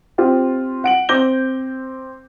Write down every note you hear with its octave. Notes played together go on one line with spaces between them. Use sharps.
C4 F4 G4
F#5 D7 F#7
C4 D6 G6 A#6 G7